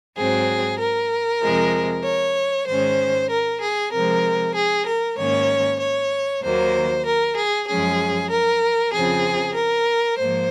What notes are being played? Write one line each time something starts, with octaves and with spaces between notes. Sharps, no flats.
G#2 F#3 C4 G#4
A#4
F2 C3 F3 G#3
C#5
G#2 D#3 G#3 C#4 C5
A#4
G#4
C3 F3 G#3 C4 A#4
G#4
A#4
G#2 D#3 A#3 C#4 C#5
C#5
D#2 D#3 F#3 A#3 C5
A#4
G#4
F#2 F3 G#3 C#4 G#4
A#4
F2 C#3 F3 C4 G#4
A#4
G#2 F3 A#3 C5